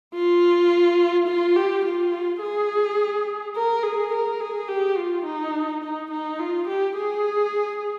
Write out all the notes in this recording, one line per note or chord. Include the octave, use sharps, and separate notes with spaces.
F4
F4
G4
F4
G#4
A#4
G#4
A#4
G#4
G4
F4
D#4
D#4
D#4
F4
G4
G#4